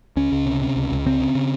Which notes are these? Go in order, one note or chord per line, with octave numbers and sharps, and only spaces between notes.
C#2 C#4
C#2
C3
C3
C#2
C#2
C#3 C4
C#3
C#3